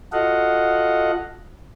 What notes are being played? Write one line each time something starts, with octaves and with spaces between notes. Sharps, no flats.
F4 F#4 A4 D#5 F5 F#5